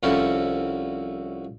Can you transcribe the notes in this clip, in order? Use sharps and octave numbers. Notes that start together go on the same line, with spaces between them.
C2 F3 C#4 E4 F#4 A4